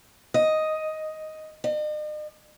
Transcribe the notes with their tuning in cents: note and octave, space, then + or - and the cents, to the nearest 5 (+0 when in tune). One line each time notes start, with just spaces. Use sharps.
D#5 +5
D#5 -45